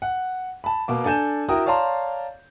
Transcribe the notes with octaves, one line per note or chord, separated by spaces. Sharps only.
F#5
A5 B5
B2 A#3 D6
D4 A4 G#5 G6 E7
E4 F#4 A#4 G5 D#6
C#5 D5 F5 A5 A#5 C6